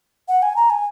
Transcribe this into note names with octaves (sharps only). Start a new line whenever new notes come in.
F#5
G#5
A#5
G#5